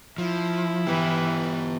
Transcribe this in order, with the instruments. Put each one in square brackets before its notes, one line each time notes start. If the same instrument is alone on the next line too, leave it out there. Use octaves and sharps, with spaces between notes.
[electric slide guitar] F3 [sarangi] E4
[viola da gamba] E3 [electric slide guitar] B3 G4